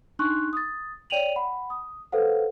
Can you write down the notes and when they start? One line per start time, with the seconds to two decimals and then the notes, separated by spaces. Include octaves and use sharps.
0.19 D4 D#4 C6 C#6 F#6
0.53 D#6 A6
1.10 C#5 D5 G5 D#7 F7 F#7
1.36 F#5 B5
1.70 D#6
2.12 A4 B4 C5 F5 F#5